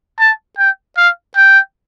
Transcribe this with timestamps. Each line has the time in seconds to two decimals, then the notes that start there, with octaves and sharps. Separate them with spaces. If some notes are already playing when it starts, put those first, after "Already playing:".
0.19 A5
0.58 G5
0.97 F5
1.36 G5